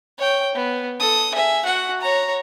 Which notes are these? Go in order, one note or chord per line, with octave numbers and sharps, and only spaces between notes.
C#5 G5
B3
A4 D#6
G#4 E5
F#4 F#5
C#5 A#5